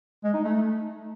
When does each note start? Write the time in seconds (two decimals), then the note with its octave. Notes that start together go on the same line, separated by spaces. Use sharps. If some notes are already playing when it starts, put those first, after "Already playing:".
0.24 G#3
0.34 D#4
0.44 A3